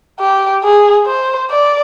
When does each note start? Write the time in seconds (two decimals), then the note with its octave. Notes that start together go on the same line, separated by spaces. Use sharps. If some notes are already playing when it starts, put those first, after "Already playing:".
0.19 G4
0.63 G#4
1.06 C5
1.50 D5